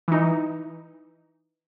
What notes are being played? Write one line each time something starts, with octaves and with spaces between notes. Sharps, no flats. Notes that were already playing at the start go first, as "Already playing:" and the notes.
E3 D#4